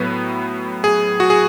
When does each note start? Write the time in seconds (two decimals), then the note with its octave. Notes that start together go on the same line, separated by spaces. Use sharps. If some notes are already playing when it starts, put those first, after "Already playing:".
Already playing: A2 F#3 B3 B4
0.84 G#4
1.20 F#4
1.30 G#4